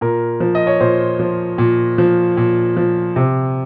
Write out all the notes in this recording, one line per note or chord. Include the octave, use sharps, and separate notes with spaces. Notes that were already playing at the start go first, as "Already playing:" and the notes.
A#2 A#4
F3
D#5
C#5
A#2 C5
F3
A#2
F3
A#2
F3
C3